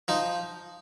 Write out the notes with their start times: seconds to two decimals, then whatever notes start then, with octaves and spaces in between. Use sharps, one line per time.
0.08 F3 D#4